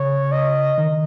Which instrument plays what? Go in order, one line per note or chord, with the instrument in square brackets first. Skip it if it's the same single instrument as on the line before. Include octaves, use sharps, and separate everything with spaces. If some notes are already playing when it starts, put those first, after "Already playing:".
Already playing: [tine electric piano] C#3 [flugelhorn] C#5
[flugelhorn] D#5
[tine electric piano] D#3